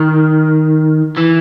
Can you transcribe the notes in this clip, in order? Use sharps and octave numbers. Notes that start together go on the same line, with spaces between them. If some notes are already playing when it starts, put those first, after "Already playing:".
Already playing: D#3
E3